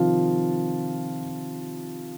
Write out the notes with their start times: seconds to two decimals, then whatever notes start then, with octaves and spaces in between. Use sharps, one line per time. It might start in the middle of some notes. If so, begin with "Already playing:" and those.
Already playing: C3 D#3 F3 F4